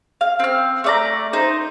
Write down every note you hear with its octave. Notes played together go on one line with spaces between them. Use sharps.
F5
C4 F6
A3 D5 A#5
D#4 C5